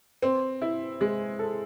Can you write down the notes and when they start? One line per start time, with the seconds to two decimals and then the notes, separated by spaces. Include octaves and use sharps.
0.22 C4
0.62 E4
1.01 G#3
1.39 A4